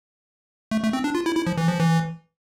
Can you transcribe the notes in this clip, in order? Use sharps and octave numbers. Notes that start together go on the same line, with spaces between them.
A3
A3
C4
D4
F4
E4
E4
F3
E3
F3
E3